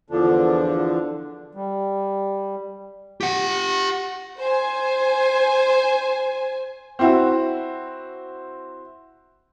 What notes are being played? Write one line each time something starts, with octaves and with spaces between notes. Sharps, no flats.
E2 D3 F3 D4
G3
G4 F#5
C5 G#5
C4 E4 F#4